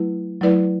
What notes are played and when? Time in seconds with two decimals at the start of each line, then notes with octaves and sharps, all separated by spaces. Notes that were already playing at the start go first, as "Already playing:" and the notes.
Already playing: F#3 A3 E4 B4
0.41 F#3 A3 E4 B4 D5